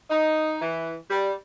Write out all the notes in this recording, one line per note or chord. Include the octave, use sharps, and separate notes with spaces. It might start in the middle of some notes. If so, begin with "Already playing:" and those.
D#4
E3
G3